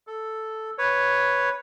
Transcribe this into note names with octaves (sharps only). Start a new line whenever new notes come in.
A4
B4 C#5